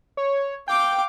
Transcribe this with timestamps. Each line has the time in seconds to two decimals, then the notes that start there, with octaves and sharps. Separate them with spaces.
0.17 C#5
0.68 F5 G5 D6